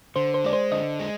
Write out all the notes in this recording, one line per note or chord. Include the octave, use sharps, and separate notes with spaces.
D3 C5
C5
G#3 D5
C5
D3 D#5
G#3